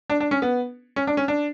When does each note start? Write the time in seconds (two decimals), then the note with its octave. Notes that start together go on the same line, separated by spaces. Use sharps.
0.10 D4
0.20 D4
0.31 C#4
0.42 B3
0.96 C#4
1.07 D4
1.17 C#4
1.28 D4